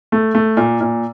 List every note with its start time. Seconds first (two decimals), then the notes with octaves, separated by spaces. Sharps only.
0.12 A3
0.35 A3
0.57 A#2
0.81 A#2